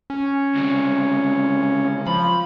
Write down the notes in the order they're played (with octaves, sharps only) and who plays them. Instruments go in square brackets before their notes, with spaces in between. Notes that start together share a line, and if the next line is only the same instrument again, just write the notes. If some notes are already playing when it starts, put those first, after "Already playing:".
[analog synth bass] C#4
[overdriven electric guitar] C#2 C3
[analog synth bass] F3 [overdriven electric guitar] B5